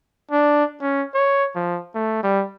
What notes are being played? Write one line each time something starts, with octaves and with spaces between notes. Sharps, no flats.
D4
C#4
C#5
F3
A3
G3